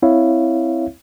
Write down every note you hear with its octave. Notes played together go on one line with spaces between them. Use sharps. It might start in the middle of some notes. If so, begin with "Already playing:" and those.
C4 E4 C#5 E5 F5